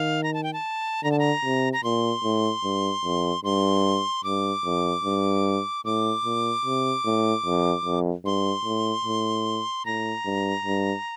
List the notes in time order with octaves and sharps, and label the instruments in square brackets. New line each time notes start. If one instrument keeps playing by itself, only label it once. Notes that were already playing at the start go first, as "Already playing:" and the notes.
Already playing: [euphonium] D#3 [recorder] F5
[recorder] A#5
A5
G5
A5
[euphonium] D3 [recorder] A#5
[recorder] A5
A#5
[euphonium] C3
[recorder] A#5
[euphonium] A#2 [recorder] C6
[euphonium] A2
G2
F2
[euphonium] G2 [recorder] C6
[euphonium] G2 [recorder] D6
[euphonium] F2
G2
[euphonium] A2 [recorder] D6
[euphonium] A#2
C3
A2
F2
F2
[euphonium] G2 [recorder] C6
[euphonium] A2
A2
[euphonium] A2 [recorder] A#5
[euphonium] G2
G2